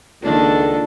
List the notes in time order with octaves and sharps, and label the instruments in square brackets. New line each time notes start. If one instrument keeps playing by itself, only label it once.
[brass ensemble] C#2 A4 [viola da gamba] D#3 A#3 [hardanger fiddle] D4